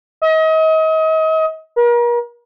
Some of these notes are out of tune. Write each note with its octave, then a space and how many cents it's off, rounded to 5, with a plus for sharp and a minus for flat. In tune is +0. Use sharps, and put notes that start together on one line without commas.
D#5 +35
A#4 +40